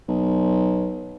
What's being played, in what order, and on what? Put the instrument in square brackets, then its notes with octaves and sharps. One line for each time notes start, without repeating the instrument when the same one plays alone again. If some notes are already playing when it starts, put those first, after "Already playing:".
[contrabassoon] B1